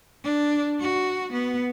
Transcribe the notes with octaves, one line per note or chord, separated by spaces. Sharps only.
D4
F#4
B3